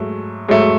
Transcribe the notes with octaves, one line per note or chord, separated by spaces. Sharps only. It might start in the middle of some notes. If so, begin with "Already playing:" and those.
Already playing: G#2 F#3 A3
G#2 F#3 A3